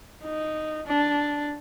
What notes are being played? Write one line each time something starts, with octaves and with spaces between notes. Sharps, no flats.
D#4
D4